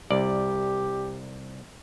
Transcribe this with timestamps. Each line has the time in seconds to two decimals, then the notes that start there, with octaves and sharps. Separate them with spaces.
0.10 C2 G4 D5